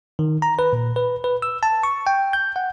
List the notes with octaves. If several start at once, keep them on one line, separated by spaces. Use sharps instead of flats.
D#3
A#5
B4
A#2
B4
B4
E6
A5
C#6
G5
G6
F#5